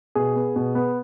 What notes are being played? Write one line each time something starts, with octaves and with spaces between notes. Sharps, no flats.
B2 G#4
B3
B2
B3